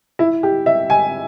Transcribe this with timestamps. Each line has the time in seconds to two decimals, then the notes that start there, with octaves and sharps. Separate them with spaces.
0.19 E4
0.43 G4
0.66 E5
0.90 G#5